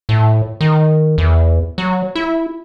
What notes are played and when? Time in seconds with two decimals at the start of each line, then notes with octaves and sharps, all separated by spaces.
0.09 A2
0.61 D#3
1.18 E2
1.78 F#3
2.15 E4